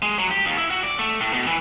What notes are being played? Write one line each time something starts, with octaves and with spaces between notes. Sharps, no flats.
G#3
F#3
G4
D#2
E4
F#4
D5
A3
A2
B2
E3